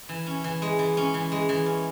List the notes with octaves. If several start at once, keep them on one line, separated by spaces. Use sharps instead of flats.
E3
C#4
E3
G#3
E3
C#4
E3
G#3
E3
C#4